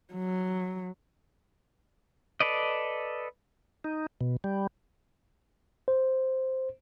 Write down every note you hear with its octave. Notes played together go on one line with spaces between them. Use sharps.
F#3
A4 B4 D5 D#5
D#4
B2
G3
C5